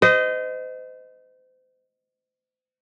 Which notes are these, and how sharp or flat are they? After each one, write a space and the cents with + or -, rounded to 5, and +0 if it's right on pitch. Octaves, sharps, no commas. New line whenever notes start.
C5 -35 D#5 +0